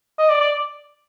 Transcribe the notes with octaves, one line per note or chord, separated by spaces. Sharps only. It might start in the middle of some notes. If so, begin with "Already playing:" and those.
D#5
D5
D5